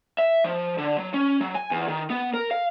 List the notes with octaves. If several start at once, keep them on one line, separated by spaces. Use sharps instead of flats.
E5
F3
D3
F#3
C#4
F#3
G#5
E2
D#3
B3
A#4
F5